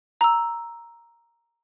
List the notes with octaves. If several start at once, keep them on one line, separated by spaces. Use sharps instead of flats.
A#5 E6